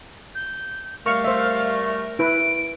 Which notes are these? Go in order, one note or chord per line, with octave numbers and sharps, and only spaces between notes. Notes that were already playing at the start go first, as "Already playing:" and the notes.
G6
G3 A3 A#4 F5 C#6
C5 E5
E4 B4 D7